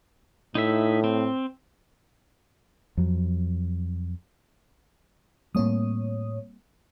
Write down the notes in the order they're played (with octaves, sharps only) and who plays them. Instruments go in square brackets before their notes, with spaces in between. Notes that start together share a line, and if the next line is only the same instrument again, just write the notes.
[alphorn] A2 [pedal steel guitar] D#4 E4 E5
[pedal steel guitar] C4
[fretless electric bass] F2 F#3
[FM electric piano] A2 C#5 D#6 [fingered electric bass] G3 A#3 C4